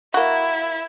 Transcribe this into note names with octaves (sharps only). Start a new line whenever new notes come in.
A#3 E4 F#4